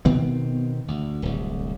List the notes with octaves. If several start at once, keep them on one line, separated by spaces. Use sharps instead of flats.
B2 D#3 B3 C4
D2
D1 C2